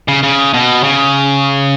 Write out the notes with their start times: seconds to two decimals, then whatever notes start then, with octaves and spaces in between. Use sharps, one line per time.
0.08 C#3
0.23 C#3
0.54 B2
0.84 C#3